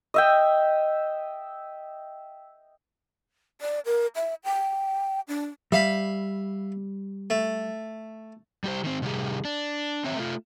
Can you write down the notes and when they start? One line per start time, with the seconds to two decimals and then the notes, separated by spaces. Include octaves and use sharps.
0.14 D#5 E5 G5
3.61 D5
3.85 A#4
4.15 E5
4.44 G5
5.28 D4
5.72 G3 E5 F5 B5
7.30 A3
8.64 G3 G4 C5
8.84 D#3 C4
9.02 C3 D#3 G3 G4 G#4
9.45 D4
10.04 C4 C#5 E5
10.16 A3 F4